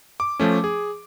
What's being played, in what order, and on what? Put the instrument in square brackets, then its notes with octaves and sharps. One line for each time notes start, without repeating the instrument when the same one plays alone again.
[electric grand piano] D6
F3 A3 C#4
G#4